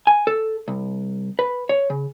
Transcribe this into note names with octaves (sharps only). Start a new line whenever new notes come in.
G#5
A4
C2
B4
C#5
C#3